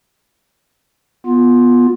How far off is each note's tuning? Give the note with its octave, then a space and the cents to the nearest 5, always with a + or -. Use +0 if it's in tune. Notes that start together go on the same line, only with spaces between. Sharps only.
B3 -10 F4 +5